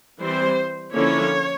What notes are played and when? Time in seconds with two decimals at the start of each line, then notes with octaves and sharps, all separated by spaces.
0.21 E3 G3 C4 C5
0.94 D3 F3 A#3 C#4 E4 C#5